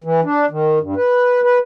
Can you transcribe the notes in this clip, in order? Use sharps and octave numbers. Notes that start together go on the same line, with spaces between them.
E3
D4
D#3
G2
B4
B4